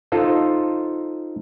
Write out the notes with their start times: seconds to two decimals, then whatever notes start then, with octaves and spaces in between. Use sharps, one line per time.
0.12 D#4 F4 A4 C5